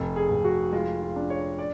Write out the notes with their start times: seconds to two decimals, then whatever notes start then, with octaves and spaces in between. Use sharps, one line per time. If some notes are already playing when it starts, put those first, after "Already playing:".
Already playing: F1 A4
0.16 G#4
0.30 F1
0.45 F#4
0.72 G#3 F4
1.02 F4
1.16 D4
1.30 C#5
1.59 D5